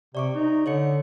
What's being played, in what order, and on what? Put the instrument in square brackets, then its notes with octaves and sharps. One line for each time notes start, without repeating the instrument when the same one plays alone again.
[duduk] C3 [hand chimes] D5 C#6 D6
[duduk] D#4
[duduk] D3 [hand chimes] C#5 D#5 C#7